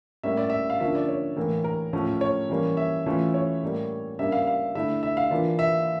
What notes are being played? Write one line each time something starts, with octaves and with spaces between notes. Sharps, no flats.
A2 G3 A#3 C#4 E5
D5
E5
F5
D3 F3 A#3 C#4 E5
D5
C#5
A2 E3 A#3
A#4
A2 F3 A3 C#4
C#5
E3 G3 A#3 C#4
E5
E3 A3 C#4 F4
C#5
A2 G3 A#3
C#3 G3 A#3 D4 E5
F5
F5
D3 A3 E4 E5
E5
F5
E3 A#3 D4 F4
E5